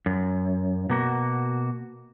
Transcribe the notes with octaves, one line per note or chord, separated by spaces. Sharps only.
F#2
B2 A#3 F#4